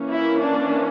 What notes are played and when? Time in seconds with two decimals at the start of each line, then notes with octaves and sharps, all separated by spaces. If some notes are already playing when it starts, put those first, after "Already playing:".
Already playing: E3 A#3 C#4
0.12 E4
0.42 D4